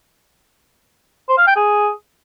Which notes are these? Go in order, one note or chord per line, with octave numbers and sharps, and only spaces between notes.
C5
F5
G5
G#4